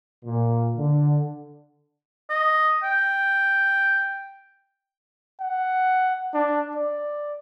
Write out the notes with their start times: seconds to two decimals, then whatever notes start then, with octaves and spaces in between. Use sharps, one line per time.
0.25 A#2
0.77 D3
2.30 D#5
2.83 G5
5.41 F#5
6.34 D4
6.75 D5